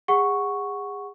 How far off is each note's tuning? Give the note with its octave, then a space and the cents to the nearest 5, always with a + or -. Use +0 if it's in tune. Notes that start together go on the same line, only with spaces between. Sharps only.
G#4 -30 F#5 +0 C#6 +0